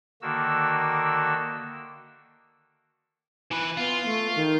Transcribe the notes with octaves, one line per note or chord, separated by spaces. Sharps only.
D3 D#3 A#3 F#4 E6
E3 B4
B3 F4
A3
D#3